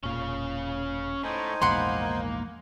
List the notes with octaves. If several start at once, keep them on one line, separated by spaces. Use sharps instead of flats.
E1 A#2 C#4 F5
A2 D#4 C5 G#5
A#1 E2 G#2 A#3 F#5 B5 C6